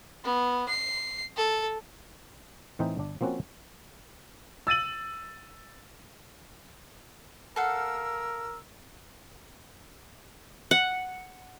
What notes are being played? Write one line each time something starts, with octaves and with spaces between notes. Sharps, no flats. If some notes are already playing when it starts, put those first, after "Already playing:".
B3
C7
A4
A2 E3 C4 D#4 G5
G1 D4
F3 A#3 C4 C#4 F#4
E6 A6 D#7 F#7
A4 A#4 F5 F#5 E6
F#5